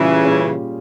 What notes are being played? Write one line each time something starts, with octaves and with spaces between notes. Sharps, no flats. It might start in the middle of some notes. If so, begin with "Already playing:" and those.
Already playing: A#2 C#3 E3 G3 C#4 G#4
A#2 G3 C#4 G#4